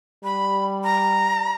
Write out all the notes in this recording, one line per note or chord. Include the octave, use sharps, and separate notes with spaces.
G3 B5
A#5